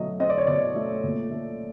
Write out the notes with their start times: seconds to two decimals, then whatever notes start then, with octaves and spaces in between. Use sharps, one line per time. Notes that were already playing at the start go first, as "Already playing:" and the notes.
Already playing: B2 F#3 A3 D#5
0.20 C4 D#5
0.29 D5
0.38 C#5
0.47 B2 D5
0.76 A3
1.04 A#2
1.31 A3